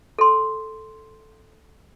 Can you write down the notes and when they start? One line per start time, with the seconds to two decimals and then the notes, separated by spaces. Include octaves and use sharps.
0.19 A4 C6